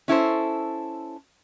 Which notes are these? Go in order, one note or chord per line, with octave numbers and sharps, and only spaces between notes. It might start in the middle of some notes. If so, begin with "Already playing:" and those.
C#4 E4 A4 C5